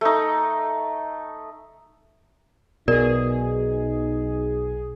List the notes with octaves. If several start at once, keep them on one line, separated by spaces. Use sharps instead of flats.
A3 D#4
B1 B2 D#4 G#4 A#4 D5